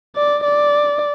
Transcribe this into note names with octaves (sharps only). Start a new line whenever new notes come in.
D5
D5